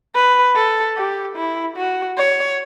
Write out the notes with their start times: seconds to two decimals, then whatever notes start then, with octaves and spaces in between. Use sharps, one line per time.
0.15 B4
0.55 A4
0.96 G4
1.36 E4
1.76 F#4
2.18 C#5